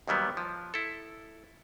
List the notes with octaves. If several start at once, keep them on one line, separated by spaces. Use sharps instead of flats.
D#2 D#3 F#3 G3 B3
F3
E4 A4